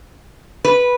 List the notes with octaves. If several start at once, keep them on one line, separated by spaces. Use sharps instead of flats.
B4